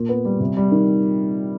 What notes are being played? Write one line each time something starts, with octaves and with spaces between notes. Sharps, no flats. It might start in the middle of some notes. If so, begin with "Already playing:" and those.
Already playing: A#2
B3
G3
C3
G3
D#3